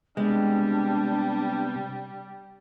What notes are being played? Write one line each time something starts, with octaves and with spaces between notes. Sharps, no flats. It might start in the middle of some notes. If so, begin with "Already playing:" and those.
C3 G3 G#3 B3 D4 G5